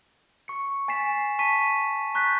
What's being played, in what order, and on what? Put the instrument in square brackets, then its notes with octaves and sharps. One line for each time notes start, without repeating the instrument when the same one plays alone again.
[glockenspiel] C#6 C#7
G#5 A6 B6 C7 E7
A5 C#6 B6 D#7
A#5 C#6 F#6 G6 A6 B6